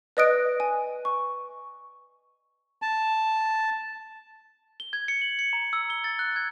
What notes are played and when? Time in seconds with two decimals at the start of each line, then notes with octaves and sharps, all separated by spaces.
0.17 B4 D5 D#5 D#6 F#6 D7
0.60 G#5
1.05 C#6
2.82 A5
4.80 G7
4.93 G#6
5.08 C#7
5.22 F#7
5.39 C#7
5.53 A#5
5.73 E6
5.90 G7
6.04 A6
6.19 F#6
6.36 G#6